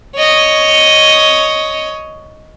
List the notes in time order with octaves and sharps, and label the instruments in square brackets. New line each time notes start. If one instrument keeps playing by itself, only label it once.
[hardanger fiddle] C#5 D#5